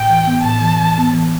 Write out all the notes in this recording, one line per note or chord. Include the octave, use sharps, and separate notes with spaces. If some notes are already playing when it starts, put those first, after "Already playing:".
Already playing: A2 G5
E3
B3
A2 A5
E3
E3
B3
E3